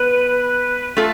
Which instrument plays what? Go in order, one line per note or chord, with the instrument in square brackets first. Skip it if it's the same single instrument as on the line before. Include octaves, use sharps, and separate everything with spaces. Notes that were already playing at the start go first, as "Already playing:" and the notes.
Already playing: [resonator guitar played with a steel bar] B3 [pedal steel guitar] B4
[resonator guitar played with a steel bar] A3 F4 A4